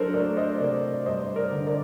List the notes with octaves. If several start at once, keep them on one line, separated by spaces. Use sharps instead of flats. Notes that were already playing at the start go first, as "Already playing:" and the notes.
Already playing: F#3 D4 A4 A#4 C5
A3 A#4 D5
C5 D#5
C3 A#4 D5
G2 C5 D#5
A#4 D5
D3
A#4 D5